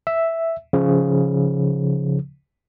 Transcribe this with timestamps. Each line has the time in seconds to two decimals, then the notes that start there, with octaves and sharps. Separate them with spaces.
0.07 E5
0.73 C#3 F3